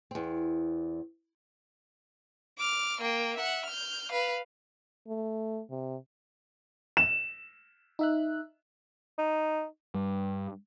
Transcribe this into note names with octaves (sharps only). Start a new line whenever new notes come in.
E2 C4
D6 F6
A#3 G5
E5 F#5
F6 G6
B4 F5
A3
C3
E7
D#4 E5 F#6
D#4
G2